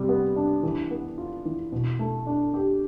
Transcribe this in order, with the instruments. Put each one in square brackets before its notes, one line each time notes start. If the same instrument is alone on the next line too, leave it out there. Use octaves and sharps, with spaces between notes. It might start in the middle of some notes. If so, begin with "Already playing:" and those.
Already playing: [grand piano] C3 G3
B3
D4
E3
B3
F4
E3
B2
A3
D4
G4